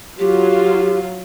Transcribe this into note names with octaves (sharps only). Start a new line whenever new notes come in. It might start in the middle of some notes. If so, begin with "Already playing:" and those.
F#3 F4 G4